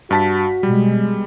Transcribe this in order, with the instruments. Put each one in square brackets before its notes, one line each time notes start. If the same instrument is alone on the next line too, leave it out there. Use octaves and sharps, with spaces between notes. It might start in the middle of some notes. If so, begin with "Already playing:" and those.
[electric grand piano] G2 A5 B6 [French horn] F#4
[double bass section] B2 G#3 [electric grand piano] G3